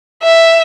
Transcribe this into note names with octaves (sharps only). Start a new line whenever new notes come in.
E5